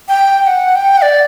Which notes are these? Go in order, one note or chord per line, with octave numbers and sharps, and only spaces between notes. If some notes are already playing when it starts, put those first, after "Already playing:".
G5
G5
F#5
G5
F#5
D5